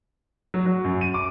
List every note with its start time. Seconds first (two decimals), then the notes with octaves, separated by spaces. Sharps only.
0.54 F#3
0.66 F#3
0.84 F#2
1.01 D#7
1.14 D6